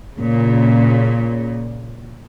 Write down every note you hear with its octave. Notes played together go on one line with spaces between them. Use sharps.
A#2 C#3